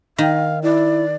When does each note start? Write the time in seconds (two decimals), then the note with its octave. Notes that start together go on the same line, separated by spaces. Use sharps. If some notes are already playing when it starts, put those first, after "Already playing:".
0.18 D#3 F5
0.63 E4 D5